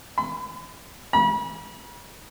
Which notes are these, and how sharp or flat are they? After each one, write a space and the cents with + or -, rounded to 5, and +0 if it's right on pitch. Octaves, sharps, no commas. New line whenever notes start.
B5 +40
B5 -40